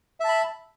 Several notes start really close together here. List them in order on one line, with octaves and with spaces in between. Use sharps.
E5 A5 B5